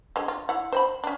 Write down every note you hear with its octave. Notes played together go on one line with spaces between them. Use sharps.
D3 G#3
F4
E4 F#5
C5 G5 B5
C#4 D4